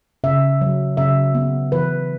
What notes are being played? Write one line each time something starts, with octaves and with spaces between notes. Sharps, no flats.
C#3 E5
F#3
C#3 E5
B3
E3 B4